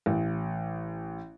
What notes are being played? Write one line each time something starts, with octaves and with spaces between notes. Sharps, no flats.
A1